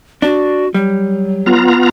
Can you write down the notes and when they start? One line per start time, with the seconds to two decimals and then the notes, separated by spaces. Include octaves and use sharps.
0.22 D4 F#4
0.74 F#3 G3
1.46 B3 F4 A#5